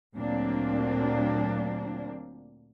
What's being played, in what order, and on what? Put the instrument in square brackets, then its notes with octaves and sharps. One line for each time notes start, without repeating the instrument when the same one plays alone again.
[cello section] D2 A#2 F#3 A#3 C4 D4